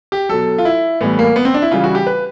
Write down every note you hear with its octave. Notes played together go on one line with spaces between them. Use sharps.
G4
B2 F#3 A4
F4
E4
A2 E3 G3 B3
A#3
B3
C4
D4
E4
C#3 E3 G3 F4
F#4
G4
B4